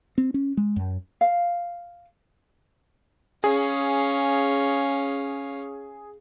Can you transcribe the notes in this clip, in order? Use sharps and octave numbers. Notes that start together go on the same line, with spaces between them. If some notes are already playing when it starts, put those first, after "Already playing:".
C4
C#4
G#3
F#2
F5
C#4 G#4 F5